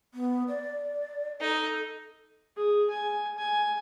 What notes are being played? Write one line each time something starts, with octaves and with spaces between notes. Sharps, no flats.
B3
D5
D#4 A4
G#4
G#5
G#5